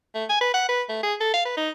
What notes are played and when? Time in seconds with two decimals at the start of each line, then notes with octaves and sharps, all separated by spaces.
0.15 A3
0.30 G#5
0.41 B4
0.54 F#5
0.69 B4
0.89 A3
1.03 G#4
1.20 A4
1.34 F5
1.45 B4
1.57 D#4